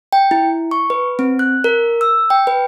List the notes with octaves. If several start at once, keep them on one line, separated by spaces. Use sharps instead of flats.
G5
E4
C#6
B4
C4
F#6
A#4
E6
G5
B4